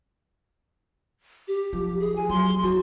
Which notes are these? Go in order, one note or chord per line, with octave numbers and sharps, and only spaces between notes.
G4
F3
G#4
G#5
F#3 C6
E3 F#4